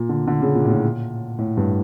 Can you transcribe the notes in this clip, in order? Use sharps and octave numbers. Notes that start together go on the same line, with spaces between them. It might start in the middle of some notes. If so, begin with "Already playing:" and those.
Already playing: A#2
D3
D3
C#3
A#2
A2
A#2
A2
G2